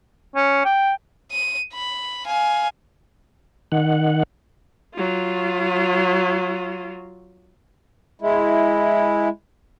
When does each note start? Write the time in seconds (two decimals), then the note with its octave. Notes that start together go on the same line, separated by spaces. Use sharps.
0.36 C#4
0.65 G5
1.31 D#7
1.73 B5
2.26 F5 G#5
3.72 D#3 F#5
4.95 F#3 F4
8.21 G#3 E4